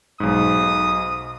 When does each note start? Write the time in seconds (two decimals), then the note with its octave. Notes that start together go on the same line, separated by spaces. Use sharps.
0.20 B1 G#2 D#6